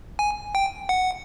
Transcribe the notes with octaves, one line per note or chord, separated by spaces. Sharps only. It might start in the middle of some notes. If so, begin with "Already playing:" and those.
G#5
G5
F#5